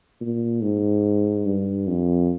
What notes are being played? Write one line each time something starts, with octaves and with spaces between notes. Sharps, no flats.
A#2
G#2
G2
F2